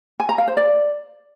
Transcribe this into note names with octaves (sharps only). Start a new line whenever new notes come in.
G#5
A#5
F5
C5
D5